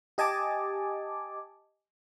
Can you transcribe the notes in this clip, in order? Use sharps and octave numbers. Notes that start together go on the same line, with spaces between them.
G4 D#5 G#5 A5 D6